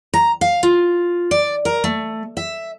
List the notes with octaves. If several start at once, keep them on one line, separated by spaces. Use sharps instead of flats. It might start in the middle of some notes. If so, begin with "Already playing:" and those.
A#5
F5
F4
D5
A#4
A3
E5